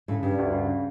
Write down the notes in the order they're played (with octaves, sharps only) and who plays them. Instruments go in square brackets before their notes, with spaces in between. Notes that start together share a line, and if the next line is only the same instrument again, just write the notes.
[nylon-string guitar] A2 [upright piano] C#3
[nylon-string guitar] G2 [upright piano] G3
[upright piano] D2
C#3